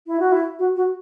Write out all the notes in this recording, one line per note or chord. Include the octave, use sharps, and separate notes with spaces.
E4
F#4
E4
F#4
F#4